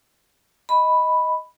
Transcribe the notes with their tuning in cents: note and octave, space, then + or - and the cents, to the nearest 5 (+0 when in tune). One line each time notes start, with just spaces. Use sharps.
D#5 +10 B5 +0